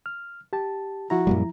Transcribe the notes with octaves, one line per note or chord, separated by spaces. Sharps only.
F6
G4 A5
F3 E4 F#4 A#5
F#2 A#2 G3